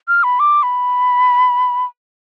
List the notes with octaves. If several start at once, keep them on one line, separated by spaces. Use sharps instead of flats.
F6
B5
D6
B5